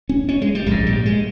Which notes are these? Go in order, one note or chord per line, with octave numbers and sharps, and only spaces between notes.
C#4
C#4
G#3
G3
A#1 G#2 G#3
G3
G#3